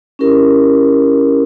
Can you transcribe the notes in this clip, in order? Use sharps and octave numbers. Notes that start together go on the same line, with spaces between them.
C#4 E4 G4 A#4